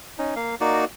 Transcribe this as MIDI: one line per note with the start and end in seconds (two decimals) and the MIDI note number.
0.18 0.35 61
0.18 0.35 63
0.36 0.55 58
0.36 0.55 77
0.61 0.85 58
0.61 0.85 63
0.61 0.85 66
0.61 0.85 74